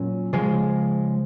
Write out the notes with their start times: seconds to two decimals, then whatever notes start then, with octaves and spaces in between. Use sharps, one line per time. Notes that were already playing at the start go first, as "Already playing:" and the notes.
Already playing: A#2 F#3 C#4
0.33 C#3 F3 G#3